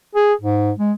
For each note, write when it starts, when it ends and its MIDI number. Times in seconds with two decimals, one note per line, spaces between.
0.15 0.33 68
0.41 0.71 44
0.78 0.92 56